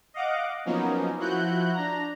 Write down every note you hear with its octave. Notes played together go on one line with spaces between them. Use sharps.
D#5 F5 F#5 D6
F3 F#3 A#3 B3 C#4 D#4
F3 E4 F#4 F#6 G6
D4 A#5